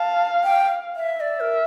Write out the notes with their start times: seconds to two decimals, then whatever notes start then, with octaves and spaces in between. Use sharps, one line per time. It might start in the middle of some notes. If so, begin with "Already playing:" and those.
Already playing: F5 A5
0.44 G5
0.96 E5
1.20 D5 E5
1.40 A#4